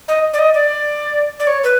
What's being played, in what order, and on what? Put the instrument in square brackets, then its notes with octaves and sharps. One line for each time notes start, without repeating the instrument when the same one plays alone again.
[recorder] D#5
D5
D#5
D5
D5
C#5
B4